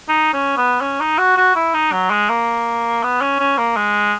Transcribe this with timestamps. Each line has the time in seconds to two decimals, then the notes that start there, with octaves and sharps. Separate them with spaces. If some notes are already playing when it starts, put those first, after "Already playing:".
0.08 D#4
0.33 C#4
0.57 B3
0.81 C#4
1.00 D#4
1.18 F#4
1.37 F#4
1.55 E4
1.74 D#4
1.92 F#3
2.10 G#3
2.29 A#3
3.03 B3
3.21 C#4
3.39 C#4
3.58 A#3
3.76 G#3